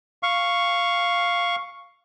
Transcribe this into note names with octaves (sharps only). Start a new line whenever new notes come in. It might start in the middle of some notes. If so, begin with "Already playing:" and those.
F5 C#6